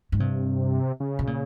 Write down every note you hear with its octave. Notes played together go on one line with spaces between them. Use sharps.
G#2
G2 C3
C#3
B2
A#2